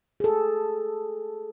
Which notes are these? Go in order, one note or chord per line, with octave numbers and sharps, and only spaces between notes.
G#4 A4